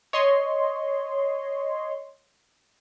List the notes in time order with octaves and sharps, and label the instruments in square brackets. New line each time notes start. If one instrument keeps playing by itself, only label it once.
[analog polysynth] C#5 D#5 C6